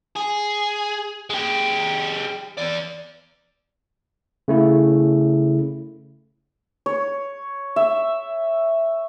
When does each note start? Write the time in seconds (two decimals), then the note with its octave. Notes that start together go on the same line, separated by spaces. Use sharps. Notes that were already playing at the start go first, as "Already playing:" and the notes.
0.16 G#4
1.30 G#3 G4
2.58 E2 D5
4.48 C#3 A3 E4
6.86 C#5
7.76 E5